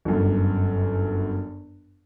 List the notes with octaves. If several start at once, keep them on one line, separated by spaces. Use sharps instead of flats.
G1 F#2